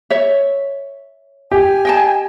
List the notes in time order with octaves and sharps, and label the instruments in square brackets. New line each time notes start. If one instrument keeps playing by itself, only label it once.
[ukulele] C#5 E5
[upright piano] G4 [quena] G#5
[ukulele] D#5 G5 A5